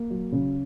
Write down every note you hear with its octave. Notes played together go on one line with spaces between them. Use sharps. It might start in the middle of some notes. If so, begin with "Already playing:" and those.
Already playing: A#3
F#3
C#3